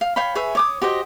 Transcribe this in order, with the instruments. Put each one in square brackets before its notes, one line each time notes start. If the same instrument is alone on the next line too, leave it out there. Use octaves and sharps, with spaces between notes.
[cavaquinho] F5
C#5 F5 G5 B5
G#4 B4 C#5 E5
C#5 D6 D#6
F#4 G4 C5 D#5